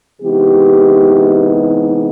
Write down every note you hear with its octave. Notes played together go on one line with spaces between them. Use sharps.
C3 E3 G#3 B3 D#4 G4